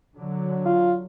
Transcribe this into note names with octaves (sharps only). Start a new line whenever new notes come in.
D3 F#3
F4